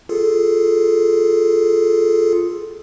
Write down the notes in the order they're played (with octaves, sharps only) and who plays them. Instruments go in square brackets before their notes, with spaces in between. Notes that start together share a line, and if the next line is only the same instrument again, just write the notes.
[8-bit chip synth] F4 G#4 A4